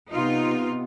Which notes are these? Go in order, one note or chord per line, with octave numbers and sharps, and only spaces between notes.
C3 B3 D#4 F4